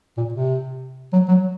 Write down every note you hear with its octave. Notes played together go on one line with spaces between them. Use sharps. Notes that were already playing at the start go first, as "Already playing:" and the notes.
A#2
C3
F#3
F#3